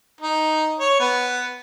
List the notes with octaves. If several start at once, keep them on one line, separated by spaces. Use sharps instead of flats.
D#4
C#5
B3